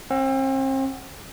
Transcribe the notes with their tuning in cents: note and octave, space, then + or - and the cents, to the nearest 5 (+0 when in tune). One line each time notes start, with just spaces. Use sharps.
C4 +40 F#5 +0